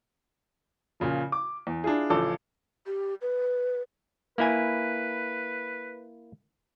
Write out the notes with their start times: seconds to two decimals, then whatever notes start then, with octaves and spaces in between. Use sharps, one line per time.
1.00 A#2 C#3 F3
1.32 D6
1.67 E2
1.84 D4 E4 F4 G#4
2.10 A1 C#3 F3 A4 C#5 D6
2.86 G4
3.22 B4
4.38 A#3 E4 B4 G#5